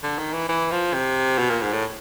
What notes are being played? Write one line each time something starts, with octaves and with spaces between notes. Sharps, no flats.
D3
D#3
E3
E3
F3
C3
B2
A#2
G#2
A2